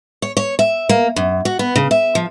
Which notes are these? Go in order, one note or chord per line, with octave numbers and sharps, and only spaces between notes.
C#5
C#5
E5
A#3
F#2
F#4
B3
C#3
E5
F3